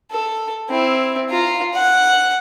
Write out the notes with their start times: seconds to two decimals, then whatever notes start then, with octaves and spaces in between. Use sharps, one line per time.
0.11 A4
0.69 C4 E4
1.30 F4 A#5
1.73 F#5